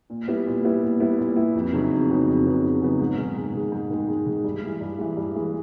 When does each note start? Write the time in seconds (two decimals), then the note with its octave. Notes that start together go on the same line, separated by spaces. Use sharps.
0.10 A#2
0.28 G3 B3 E4
0.46 A#2
0.64 G3 B3 E4
0.82 A#2
1.00 G3 B3 E4
1.18 A#2
1.36 G3 B3 E4
1.55 F2
1.73 C#3 F#3 B3 D#4
1.91 F2
2.10 C#3 F#3 B3 D#4
2.27 F2
2.45 C#3 F#3 B3 D#4
2.63 F2
2.81 C#3 F#3 B3 D#4
2.99 G#2
3.18 D#3 G#3
3.36 G#2
3.54 D#3 G#3
3.72 G#2
3.90 D#3 G#3
4.08 G#2
4.26 D#3 G#3
4.44 G2
4.63 E3 G#3
4.81 G2
4.98 E3 G#3
5.17 G2
5.35 E3 G#3